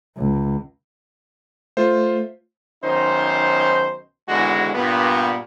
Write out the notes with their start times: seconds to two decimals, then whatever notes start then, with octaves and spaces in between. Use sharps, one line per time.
0.18 C#2
1.77 A3 F4 C5
2.83 B1 D#3 C#4 D#4 C5
4.29 G#1 E2 D3 G#3 E4 F#4
4.74 G2 A#2 B3